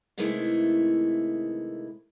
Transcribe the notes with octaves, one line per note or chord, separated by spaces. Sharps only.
C3 D#3 E3 G#3 A3 E4